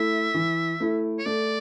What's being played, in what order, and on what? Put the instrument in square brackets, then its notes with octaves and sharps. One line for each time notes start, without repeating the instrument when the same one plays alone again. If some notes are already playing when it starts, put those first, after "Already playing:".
Already playing: [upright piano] A3 E4 [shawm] E5
[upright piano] E3
A3 E4
[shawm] C#5
[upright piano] A3 [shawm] D5